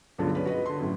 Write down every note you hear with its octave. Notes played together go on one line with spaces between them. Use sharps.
C#2 G2 B2 D3 F#3 F4
C#4 G#4 B4 D5
F#4 B4 D#5
D3 C6
F#2 A2